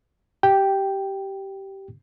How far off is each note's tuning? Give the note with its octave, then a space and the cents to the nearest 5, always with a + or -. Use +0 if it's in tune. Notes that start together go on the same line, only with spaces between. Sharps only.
G4 -15 G5 +0